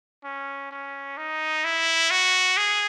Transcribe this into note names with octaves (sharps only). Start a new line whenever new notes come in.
C#4
C#4
D#4
E4
F#4
G#4